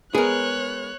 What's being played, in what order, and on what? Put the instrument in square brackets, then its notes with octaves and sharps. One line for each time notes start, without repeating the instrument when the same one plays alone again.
[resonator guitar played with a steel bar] G#3 A#4 [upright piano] B3 [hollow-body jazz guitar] G#4 [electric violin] C#5 F#6